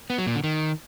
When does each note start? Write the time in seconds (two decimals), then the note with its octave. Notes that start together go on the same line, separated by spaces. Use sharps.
0.10 B3
0.18 F#3
0.27 A#2
0.35 D3
0.44 D#3